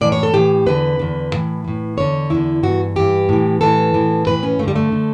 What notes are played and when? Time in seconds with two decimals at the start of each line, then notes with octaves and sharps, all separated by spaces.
0.01 A2 E3 D5
0.12 C#5
0.23 A4
0.34 A2 E3 G4
0.66 E2 D3 B4
0.99 E2 D3
1.32 A2 E3
1.64 A2 E3
1.97 E2 D3 C#5
2.30 E2 D3 E4
2.63 G2 E3 F#4
2.96 G2 E3 G4
3.29 A2 E3
3.61 A2 E3 A4
3.94 A2 E3
4.27 A2 E3 B4
4.43 C#4
4.59 G2 A3
4.63 D3 G3
4.76 A3
4.92 D3